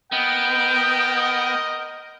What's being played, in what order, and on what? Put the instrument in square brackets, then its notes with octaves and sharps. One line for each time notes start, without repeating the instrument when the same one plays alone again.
[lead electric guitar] B3 [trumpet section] A#4 D#5 [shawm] G5